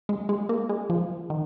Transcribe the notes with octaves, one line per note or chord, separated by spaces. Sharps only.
G#3
G#3
A#3
G#3
F3
D#3